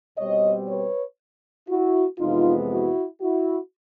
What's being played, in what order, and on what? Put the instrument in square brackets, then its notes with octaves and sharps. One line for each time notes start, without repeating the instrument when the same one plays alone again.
[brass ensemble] B2 G3 C4 C#5 D#5
B4 C#5
E4 F#4
F2 C3 E3 G#3 B3 D#4 F4
E4 F#4
E4 F#4